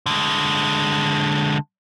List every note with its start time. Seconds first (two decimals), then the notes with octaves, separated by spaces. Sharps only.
0.06 D3 G#3